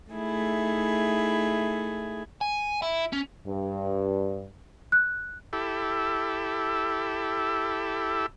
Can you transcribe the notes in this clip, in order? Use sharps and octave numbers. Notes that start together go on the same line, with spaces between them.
A3 D#4 E4 G#4
G#5
E4
C#4
G2
F#6
E4 G4 A4